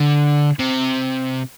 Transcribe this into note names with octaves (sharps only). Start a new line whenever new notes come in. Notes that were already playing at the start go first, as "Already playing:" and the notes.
Already playing: D3
C3